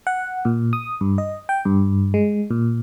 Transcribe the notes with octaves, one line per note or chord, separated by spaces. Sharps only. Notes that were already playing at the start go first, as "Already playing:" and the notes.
F#5
A#2
D#6
G2
D#5
G5
G2
G#3
A#2